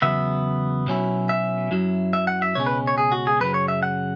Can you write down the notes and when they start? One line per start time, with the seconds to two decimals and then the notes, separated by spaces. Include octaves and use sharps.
0.02 E2 C#3 F#3 B3 E5
0.87 B1 B2 F#3 C#4 E4
1.29 E5
1.71 F#2 F#3 E4
2.13 E5
2.27 F#5
2.42 E5
2.55 C#2 B2 G#3 C#4 C#5
2.66 B4
2.87 C#5
2.98 G#4
3.12 F#4
3.27 G#4
3.40 F#2 C#3 F#3 B4
3.54 C#5
3.68 E5
3.83 F#5